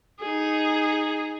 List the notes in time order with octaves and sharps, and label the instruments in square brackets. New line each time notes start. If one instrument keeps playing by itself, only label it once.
[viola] D#4 G#4